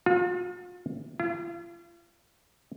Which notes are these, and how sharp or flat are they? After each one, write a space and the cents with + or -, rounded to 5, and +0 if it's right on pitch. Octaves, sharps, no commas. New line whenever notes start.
F4 +40
F4 -40